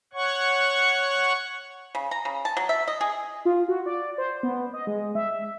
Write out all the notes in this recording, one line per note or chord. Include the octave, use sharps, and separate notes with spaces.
C#5 F#5 C#6
C#3
A#5
C#3
A5
F#3
E5
D#5
G#4
F4
F#4
D5
C5
B3
D#5
G#3
E5